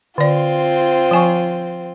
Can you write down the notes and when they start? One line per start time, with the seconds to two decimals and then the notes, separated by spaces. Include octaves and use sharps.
0.18 D3 C4 F4 D5
1.11 F3 G#5 C#6